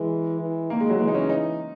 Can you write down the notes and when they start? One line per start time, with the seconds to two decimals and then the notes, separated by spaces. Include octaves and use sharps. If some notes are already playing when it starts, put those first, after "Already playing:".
Already playing: E3 G#3
0.41 E3
0.70 D#3 A#3
0.80 G#3
0.90 F#3
1.00 E3 G#3
1.08 D#4
1.14 C#4
1.29 D#4